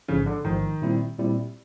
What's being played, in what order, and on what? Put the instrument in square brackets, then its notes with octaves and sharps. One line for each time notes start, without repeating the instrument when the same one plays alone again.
[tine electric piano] A1 G#2 F3 [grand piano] C#3
[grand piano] D3
[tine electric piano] A1 G#2 F3 [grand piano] D#3
[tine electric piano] A#2 G3 C4 E4
A#2 G3 C4 E4